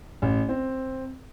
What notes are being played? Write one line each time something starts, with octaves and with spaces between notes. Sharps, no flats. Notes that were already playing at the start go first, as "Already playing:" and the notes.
A1
C4